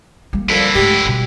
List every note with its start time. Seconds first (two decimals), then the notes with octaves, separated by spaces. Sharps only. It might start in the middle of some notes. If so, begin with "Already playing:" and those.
0.33 G3 A#3
0.50 F2 A#2 D3 E4
0.75 G#2 A3 G4
1.05 B2 G3